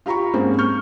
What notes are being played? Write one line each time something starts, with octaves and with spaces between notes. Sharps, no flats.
F4 G4 A#5 B5 C#6
G#2 G#3 A#3 C4 C#4
C#6 F6 G6